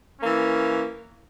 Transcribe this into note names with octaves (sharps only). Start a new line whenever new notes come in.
E3 A#3 C#4